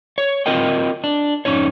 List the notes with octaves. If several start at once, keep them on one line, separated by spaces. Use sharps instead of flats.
C#5
C4 F4 A#4 D#5 G5
D4
F2 F3 C#4 D#4 C#5